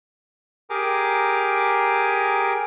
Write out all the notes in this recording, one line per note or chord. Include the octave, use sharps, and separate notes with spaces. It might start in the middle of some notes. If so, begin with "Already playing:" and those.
G4 G#4 A#4 G#5 A#5 D6